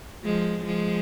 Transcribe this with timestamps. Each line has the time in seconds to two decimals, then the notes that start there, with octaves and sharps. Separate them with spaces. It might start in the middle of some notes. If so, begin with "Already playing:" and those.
0.25 F3 G#3
0.65 F3 G#3